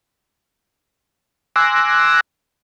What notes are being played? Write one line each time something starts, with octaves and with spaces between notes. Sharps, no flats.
G#5 C6 D6 E6 F#6 A#6